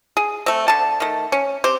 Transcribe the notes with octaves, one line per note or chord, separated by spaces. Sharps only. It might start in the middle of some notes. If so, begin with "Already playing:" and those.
G#4
A3 C4
D3 A5
D#3 A3
C#4
C4 G4